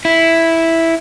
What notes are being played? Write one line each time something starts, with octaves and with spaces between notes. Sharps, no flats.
E4